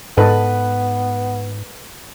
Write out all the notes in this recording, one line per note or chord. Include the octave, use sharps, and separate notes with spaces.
G#2 B3 A4 B4 D#5